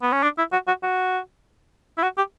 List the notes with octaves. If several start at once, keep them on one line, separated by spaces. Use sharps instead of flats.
B3
C#4
D4
E4
F#4
F#4
F#4
E4
F#4
G4